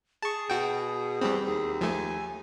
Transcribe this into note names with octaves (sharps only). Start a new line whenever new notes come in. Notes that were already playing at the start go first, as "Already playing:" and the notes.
G#4 A5 C#6
B2 F#4 G5
E2 G3 C4
D#2 G#4
F3 A3 G#5